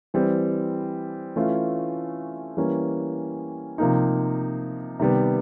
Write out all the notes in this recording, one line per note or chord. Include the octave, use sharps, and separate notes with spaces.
E3 G3 C4
E3 A3 C#4 F4
E3 G3 A#3 C#4
C3 F3 A#3 D#4
C3 D#3 G3 B3